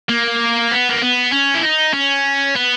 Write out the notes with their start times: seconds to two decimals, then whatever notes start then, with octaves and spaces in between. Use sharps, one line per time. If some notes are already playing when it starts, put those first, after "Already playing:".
0.09 A#3
0.72 B3
0.90 A#3
1.02 B3
1.32 C#4
1.54 E4
1.63 D#4
1.94 C#4
2.55 B3